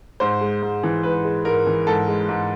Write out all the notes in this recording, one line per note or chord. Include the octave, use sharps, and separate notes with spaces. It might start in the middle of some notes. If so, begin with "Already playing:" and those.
G#2 C5
G#3
G#2
E3
G#2 B4
G#3
G#2 A#4
E3
G#2 A4
G#3
G#2